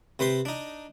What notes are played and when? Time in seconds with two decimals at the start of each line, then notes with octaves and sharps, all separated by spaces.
0.19 C3 B4 C5 C6
0.45 D4 D#4